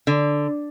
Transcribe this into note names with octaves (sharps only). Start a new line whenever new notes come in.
D3